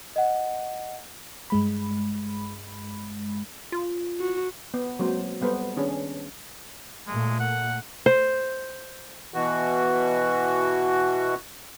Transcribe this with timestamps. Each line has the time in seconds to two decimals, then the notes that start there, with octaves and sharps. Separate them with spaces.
0.16 D#5 F#5
1.50 G2 G#3 B5
3.72 F4
4.19 F#4
4.74 B3
4.99 F#3 G#3 A#3 C4 F#4 C5
5.41 G3 B3 A4 B4 C5
5.76 D#3 C#4 D4 G#4
7.07 A#2 G#3 A3
7.40 F#5
8.06 C5
9.34 B2 E3 F#4